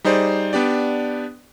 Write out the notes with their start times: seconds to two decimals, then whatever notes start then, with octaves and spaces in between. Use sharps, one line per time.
0.04 G3 D#4 G#4 C5 D5
0.53 B3 D4 G4 D5